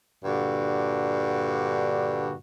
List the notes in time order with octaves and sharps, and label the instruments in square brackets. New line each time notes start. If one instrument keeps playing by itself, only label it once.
[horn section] G2 A#2 D3 F#4